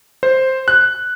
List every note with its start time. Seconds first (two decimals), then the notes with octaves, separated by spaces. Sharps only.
0.23 C5
0.68 F#6